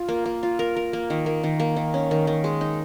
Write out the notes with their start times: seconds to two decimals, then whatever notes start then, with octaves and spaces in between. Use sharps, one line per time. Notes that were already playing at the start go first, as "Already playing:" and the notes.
Already playing: F4
0.08 A#3
0.26 A#3
0.43 F4
0.59 A#4
0.76 A#4
0.93 A#3
1.10 D#3
1.26 A#3
1.43 D#3
1.60 A#3
1.76 D#3
1.94 C#4
2.11 D#3
2.27 D#3
2.44 G#3
2.61 D#4